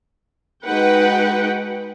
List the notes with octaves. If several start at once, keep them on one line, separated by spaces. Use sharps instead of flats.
G#3 D#4 F#4 B4 F#5 G5